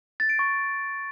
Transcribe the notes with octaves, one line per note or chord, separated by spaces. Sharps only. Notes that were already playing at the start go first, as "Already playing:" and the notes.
A6
D7
C#6